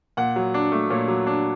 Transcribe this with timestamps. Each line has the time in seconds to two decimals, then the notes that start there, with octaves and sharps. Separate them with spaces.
0.17 A#2 F#5
0.36 F#3
0.54 D4
0.72 A3
0.90 A#2 C#5
1.08 F#3
1.27 D4